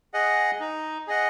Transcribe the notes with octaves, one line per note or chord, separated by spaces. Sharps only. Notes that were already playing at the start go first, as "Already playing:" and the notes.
G#4 D#5 F#5
D#4
G#4 D#5 F#5